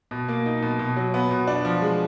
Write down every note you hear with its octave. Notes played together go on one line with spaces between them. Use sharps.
B2
A#3
D#4
B2
B2
F#3
B3
B2
D4
F3
G#3